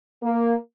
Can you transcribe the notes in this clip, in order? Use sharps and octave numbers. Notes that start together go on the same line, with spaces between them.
A#3